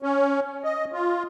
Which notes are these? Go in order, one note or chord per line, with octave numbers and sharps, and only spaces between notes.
C#4
D#5
F4